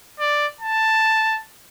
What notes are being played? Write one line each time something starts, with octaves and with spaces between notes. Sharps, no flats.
D5
A5